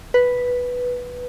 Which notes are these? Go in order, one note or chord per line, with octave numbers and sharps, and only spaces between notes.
B4